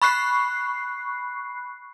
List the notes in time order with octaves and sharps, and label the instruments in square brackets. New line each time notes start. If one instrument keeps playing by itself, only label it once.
[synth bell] B5 C#6 F#6 C7